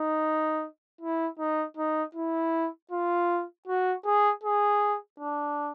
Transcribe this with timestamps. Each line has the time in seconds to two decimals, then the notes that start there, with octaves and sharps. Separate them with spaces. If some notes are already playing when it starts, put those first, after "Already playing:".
Already playing: D#4
1.01 E4
1.39 D#4
1.77 D#4
2.15 E4
2.91 F4
3.67 F#4
4.05 G#4
4.44 G#4
5.20 D4